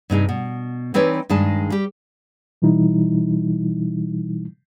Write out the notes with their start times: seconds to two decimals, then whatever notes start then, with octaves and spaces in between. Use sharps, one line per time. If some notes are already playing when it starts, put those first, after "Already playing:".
0.10 G2 C3 D#4 G#4
0.29 B2
0.94 E3 C4 D#4 B4 C#5 D5
1.29 G2 D#3 G#3 G#4 A5
1.70 G3 G4
2.62 B2 E3 G3 D#4 E4